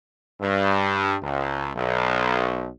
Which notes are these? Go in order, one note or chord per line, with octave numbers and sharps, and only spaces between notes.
G2
C#2
B1